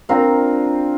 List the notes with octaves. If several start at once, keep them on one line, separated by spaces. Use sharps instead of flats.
C4 D4 F4 A#4